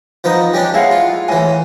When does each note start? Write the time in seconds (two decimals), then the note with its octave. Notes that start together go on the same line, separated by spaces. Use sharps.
0.24 F3 B3 D#4
0.53 G3 C#4 D4
0.74 G#3 E4 F5 F#5
0.91 F4
1.28 A2 E3 G#5